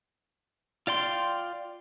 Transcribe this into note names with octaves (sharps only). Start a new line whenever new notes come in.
F4 D5 G5 C6